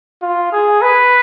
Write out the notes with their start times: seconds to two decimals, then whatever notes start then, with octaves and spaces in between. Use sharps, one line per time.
0.23 F4
0.52 G#4
0.82 B4